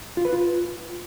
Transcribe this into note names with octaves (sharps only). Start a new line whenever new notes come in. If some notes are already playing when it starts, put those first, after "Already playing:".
F4
B4
F4